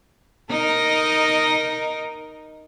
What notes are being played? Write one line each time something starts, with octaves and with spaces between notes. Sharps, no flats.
D#4 A#4 D#5